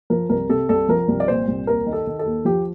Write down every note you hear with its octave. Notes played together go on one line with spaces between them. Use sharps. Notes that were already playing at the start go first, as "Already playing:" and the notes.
F3 A#4
C2 A#4
C3 A4
C2 A4
F3 A#4
C2
D5
A#2 C5
C2
D#2 A#4
D#3
A4
D#3
A4
D#2
F3 G4